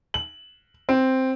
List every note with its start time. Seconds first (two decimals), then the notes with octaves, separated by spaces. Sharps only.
0.14 F#7
0.89 C4